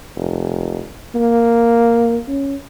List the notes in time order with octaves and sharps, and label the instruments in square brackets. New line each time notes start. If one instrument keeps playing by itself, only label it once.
[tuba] F1
A#3
C#4